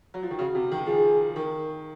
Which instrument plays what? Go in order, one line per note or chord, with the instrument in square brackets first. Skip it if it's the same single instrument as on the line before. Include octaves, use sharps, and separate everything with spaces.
[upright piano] F#3
F3
D#3
[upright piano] C#3 [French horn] F#4
[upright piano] C3
D#3
[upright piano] F3 [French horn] G#4
[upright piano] D#3 [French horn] A#4